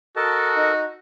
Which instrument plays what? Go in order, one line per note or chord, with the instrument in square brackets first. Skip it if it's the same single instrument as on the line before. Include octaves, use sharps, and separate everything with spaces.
[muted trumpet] F#4 [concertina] A4 A#4 D#5 [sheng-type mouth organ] A5
[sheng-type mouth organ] D#4